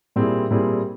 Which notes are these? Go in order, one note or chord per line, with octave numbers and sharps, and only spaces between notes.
A#2 G3 C4 E4 G#4
A#2 G3 C4 E4 G#4